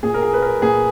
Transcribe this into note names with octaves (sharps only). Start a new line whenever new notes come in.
A#2 G#4
A#4
G#4
B4
A#4
A#2 G#4